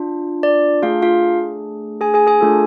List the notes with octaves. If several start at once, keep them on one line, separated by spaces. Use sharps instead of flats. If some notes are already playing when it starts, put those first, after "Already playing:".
Already playing: D4 F4
D5
A3 D4 F4 G#4 F5
F4 F5
G#4 G#5
G#4 G#5
G#4 G#5
A3 D4 F4 A4